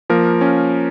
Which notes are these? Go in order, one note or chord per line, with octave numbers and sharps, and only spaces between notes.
F3 A#3 A#4
C#4